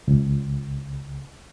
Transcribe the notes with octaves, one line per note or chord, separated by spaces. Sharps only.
C#2